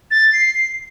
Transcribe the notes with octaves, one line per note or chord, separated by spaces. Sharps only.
A6
C7
C7